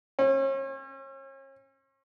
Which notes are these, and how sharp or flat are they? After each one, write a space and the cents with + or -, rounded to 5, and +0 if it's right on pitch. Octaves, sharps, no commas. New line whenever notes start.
C#4 -40